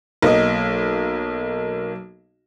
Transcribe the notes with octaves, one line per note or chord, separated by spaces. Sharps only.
B1 A#3 D#5